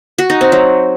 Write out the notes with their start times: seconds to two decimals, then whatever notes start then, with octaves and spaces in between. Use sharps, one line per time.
0.18 F#4
0.30 D#4
0.41 C4
0.52 F#3